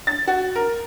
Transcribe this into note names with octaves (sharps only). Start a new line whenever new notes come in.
A6
F#4
A#4